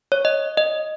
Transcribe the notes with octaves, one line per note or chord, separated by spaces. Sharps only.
C#5
D#5
D#5